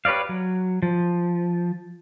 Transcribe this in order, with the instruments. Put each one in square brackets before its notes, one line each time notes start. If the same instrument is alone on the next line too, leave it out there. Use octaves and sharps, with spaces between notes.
[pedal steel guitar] G4 B4 C#5 D5 F5
F#3
F3